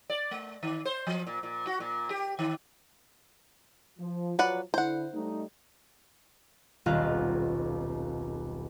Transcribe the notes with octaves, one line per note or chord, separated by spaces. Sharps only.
D5
A3
D#3
C5
F3
A#2
A#2
F#4
A#2
G4
D#3
F3
F3 F#3 B4 D5 F#5
D3 E4 C5 F#5
G3 A3 D#4
D#1 B1 C4 F4 F5 F#6